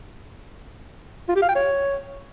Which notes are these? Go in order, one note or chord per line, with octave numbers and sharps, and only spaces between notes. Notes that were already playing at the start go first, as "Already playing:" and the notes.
F4
G4
F5
G5
C#5